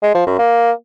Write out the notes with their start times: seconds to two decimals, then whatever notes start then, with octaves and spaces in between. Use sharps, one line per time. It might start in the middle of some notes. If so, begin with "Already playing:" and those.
0.03 G#3
0.15 F3
0.27 F#2
0.39 A#3